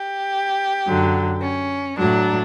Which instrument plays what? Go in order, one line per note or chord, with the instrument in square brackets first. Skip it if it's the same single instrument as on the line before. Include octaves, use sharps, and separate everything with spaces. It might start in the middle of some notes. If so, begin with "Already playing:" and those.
Already playing: [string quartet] G4
F#2 D3 F#3
C#4
A2 F#3 D4